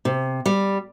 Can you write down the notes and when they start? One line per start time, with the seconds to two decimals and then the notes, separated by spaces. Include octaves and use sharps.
0.05 C3
0.46 G3